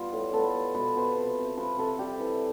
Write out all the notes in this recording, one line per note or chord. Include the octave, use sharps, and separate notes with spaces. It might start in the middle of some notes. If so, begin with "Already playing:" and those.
Already playing: G3 B3 F4
A2
B3 A4
B3
B2 B4
B2 C5
C3
C3
F3 B4
C3 A4
G3 G4
E3